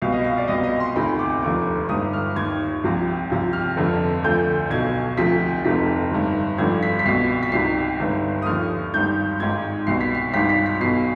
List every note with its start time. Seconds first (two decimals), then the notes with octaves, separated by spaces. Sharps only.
0.02 C2 B2 F5
0.12 D#5
0.24 F5
0.38 D5
0.48 C2 B2 D#5
0.63 D#5
0.80 C6
0.96 D2 C3 D#3 B5
1.19 D6
1.42 F1 D#2 D3 F3 D6
1.89 G1 G2 D#3 D#6
2.13 F6
2.36 D#2 D#3 G#6
2.84 C2 C3 F3
3.30 C2 C3 F3
3.53 F6
3.76 G1 F2 D3 F3
4.24 D2 D3 F3 G6
4.70 B1 B2 G#6
5.17 D2 C3 F3 B6
5.65 F1 F2 C3 D#3 B6
6.12 G1 G2 D#3
6.58 G#1 G2 D3 F3 G#6
6.83 B6
6.99 B6
7.05 C2 B2 C7
7.43 B6
7.52 C2 C3 D#3 C7
8.00 G1 G2 D#3
8.42 D#6
8.46 D#2 D3 F3 F6
8.93 G#1 G2 D#3 G6
9.40 G#1 G#2 D#3 G#6
9.87 C2 B2 C7
10.01 B6
10.15 C7
10.34 G#1 G2 D#3 B6
10.49 B6
10.66 B6
10.81 B1 B2 C7